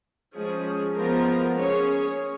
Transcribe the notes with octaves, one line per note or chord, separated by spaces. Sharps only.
F3 G#3 C#4 G#4
F3 G#3 B3 F4 A#4
C#4 G#4 C#5